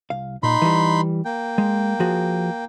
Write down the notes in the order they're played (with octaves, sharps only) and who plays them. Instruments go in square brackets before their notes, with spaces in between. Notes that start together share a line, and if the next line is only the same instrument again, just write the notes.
[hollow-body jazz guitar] C2 F5
[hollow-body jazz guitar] A#2 [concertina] D#4 B5 C6
[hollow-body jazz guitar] E3 G3
[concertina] A#3 G5
[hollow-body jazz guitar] G#3
F3 F#4 G#4